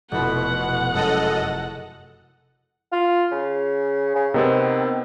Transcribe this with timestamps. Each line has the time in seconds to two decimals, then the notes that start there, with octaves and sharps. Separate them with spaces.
0.12 F1 B2 E4 F#5
0.92 F#2 G#3 A4 D#5
2.92 F4
3.31 C#3
4.15 C#3
4.34 C3 D#3 B3 C4